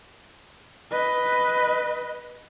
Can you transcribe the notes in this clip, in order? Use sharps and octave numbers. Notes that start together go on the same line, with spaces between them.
B4 D#5